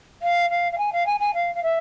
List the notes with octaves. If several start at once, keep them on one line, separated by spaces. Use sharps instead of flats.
F5
F5
F5
G#5
F5
G#5
G#5
F5
F5
E5